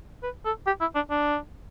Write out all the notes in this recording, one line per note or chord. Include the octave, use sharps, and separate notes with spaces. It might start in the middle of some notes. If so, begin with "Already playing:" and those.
B4
A4
G4
E4
D4
D4